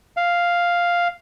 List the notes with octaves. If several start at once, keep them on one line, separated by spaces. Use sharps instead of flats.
F5